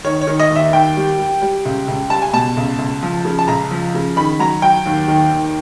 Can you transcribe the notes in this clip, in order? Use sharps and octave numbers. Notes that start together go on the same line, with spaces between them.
D#3 C#5
C#5
D#3
D#5
D#2 E5
D#2 G5
G3
G3
G3
C#2
C#2
G3 A5
G#5
B2 A5
C#2
C#2
F3
C#3
A5
C#2 A#5
F3
C#3
D#3 B5
F#3 A#5
F#3 G5
D#2
D#3
D#2